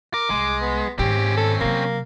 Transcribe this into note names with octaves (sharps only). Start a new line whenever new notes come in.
A#4 D6
C2 G#3
B3
G#2 D#3 C4 C#4 G4
A4
C3 F#3 A#3